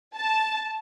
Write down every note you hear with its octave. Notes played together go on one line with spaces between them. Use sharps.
A5